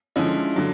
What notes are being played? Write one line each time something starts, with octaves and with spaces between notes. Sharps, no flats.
D3 F3 G#3 C#4 E4
D3 F#3